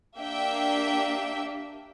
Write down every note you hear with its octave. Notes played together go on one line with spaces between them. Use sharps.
A#3 D4 G4 E5 G5